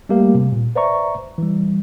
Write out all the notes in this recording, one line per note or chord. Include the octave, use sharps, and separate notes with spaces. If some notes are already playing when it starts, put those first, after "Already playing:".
G3 A3 A#3 G4 A#4 F5
C3
A#2
B4 C5 D5 E5 A#5 C#6
E3 G3